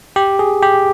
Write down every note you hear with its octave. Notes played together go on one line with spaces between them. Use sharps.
G4
G#4
G4